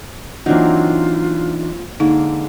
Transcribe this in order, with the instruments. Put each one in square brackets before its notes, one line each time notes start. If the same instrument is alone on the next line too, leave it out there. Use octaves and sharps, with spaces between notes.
[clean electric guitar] E3 D4 D#4 [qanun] F#3 A#3 C4 [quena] F4
[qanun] D3 G#3 A#3 [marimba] D#4